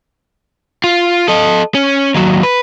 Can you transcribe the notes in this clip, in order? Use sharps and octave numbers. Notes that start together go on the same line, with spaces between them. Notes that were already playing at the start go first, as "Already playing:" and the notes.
F4
A4 D#5
C#4
D#2 F#3
B4